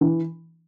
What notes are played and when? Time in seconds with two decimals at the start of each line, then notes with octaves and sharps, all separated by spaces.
0.01 E3